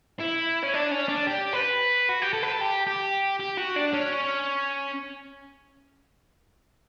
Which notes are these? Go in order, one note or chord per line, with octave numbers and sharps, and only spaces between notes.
E4
C#4
D4
C#4
D4
G4
B4
F#4
G4
A4
B4
A4
G4
G4
G4
F#4
D4
C#4